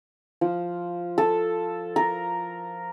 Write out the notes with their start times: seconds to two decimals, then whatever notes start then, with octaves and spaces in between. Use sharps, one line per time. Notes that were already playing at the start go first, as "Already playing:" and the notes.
0.41 F3
1.18 A4
1.96 A#4